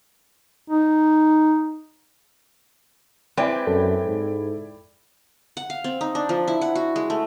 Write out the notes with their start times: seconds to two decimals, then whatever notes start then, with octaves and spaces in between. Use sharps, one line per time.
0.70 D#4
3.37 G#3 C4 E4 B4 D5 G5
3.67 F#2 A4
4.05 G#2
5.57 F#5
5.70 F5
5.84 C4
6.01 D#4
6.15 D4
6.29 F3
6.48 E4
6.61 F#5
6.75 F#4
6.96 G#3
7.10 A3